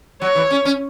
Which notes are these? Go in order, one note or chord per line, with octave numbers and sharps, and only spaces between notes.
F#3 C#5
E3
C#4
C#4